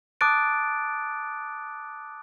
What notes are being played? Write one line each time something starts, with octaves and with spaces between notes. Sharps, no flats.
A5 D6 D#6 F#6 A6 D7